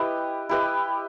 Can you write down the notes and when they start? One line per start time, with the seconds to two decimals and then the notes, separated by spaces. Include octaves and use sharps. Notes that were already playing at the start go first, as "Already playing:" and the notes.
Already playing: E4 G4 B4 D#5
0.49 E4 G4 B4 D#5